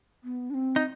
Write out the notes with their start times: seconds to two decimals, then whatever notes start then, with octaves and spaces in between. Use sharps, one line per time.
0.24 B3
0.50 D4
0.54 C4
0.76 D#4